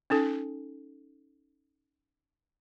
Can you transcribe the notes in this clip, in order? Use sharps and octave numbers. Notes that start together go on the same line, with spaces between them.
C#4 D#4 A4